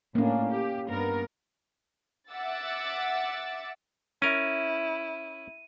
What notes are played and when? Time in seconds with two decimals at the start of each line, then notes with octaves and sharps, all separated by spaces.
0.15 A2 A#3 C#4 D4
0.51 G4
0.89 G2 B3 A#4
2.31 E5 F#5 D6 E6 A6
4.22 C#4 E4 A#4 D#7